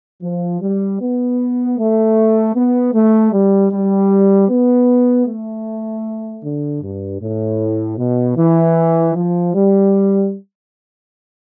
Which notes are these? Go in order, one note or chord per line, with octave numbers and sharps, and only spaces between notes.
F3
G3
B3
A3
B3
A3
G3
G3
B3
A3
D3
G2
A2
B2
E3
F3
G3